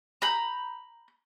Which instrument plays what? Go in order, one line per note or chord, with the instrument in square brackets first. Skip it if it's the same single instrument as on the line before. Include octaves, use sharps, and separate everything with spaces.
[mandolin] A#5 B5 G6